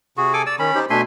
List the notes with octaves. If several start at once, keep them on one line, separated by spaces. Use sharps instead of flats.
C3 F#4 G#4
A4 G#5 D6
D5 E6
D#3 C#4 B5
D#4 G4 C5
B2 A3 D4 E5 G#5 C6